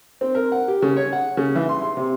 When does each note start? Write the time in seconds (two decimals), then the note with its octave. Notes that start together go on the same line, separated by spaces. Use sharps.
0.21 C4
0.35 A#4
0.52 F#5
0.68 G4
0.82 C#3
0.96 C#5
1.13 F#5
1.37 C#3
1.55 E3
1.69 C6
1.82 C6
1.97 C3